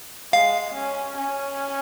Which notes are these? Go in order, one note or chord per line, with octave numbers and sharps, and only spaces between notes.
G#3 F5
C#4
C#4